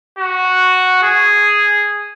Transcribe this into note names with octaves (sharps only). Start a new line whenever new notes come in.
F#4
G#4